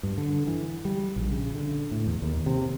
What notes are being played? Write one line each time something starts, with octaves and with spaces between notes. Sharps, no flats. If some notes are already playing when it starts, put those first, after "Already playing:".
G2
D3
E3
G3
A#1
C#3
D3
A2
E2
D#2
C3